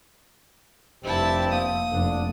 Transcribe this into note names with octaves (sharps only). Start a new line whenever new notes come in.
F1 G2 C4 E4 G4 A5
A#3 D#6
F1 D3 D4